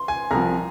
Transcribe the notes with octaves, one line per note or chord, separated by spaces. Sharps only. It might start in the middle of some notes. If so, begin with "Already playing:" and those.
Already playing: C6
G#5
C2 C3 F3 A#5